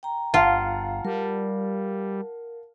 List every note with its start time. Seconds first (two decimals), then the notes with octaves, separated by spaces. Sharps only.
0.03 G5 A#5
0.34 G1 F4 F5 F#5 A5
1.05 G3 A#4